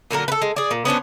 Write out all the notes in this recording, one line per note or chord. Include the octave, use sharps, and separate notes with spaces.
A#2 D3 F#3 A#4
A4 B4
G#3
G#4 D5
A#2
B3 C#4 D4 C5